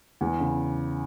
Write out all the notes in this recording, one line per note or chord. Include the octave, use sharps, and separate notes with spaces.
E2
C#3